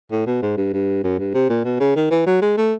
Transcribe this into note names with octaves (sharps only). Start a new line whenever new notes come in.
A2
B2
G#2
G2
G2
F#2
G2
C3
A#2
B2
C#3
D#3
E3
F#3
G#3
A3